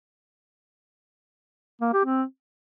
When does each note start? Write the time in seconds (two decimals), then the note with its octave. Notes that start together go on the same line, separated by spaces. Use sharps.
1.81 A#3
1.93 G4
2.05 C4